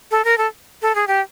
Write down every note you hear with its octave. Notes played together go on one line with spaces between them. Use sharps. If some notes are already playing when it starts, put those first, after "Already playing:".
A4
A#4
A4
A4
G#4
G4